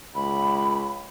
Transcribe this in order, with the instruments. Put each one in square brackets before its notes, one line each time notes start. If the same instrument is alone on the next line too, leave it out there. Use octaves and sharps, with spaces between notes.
[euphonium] C#2 [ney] B5